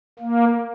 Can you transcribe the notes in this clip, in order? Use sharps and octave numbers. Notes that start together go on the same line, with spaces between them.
A#3